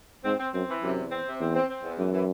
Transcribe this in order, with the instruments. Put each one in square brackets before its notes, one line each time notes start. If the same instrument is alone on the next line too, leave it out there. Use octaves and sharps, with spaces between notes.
[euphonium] G#2 [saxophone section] C4
[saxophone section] C4
[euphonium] F#2 [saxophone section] C4
[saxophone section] E3
[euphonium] F#2 [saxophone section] C3
[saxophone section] E2
C4
C3
[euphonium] E2 [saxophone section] C4
[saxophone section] C4
C4
E2
[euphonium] F#2 [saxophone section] E3
[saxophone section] E3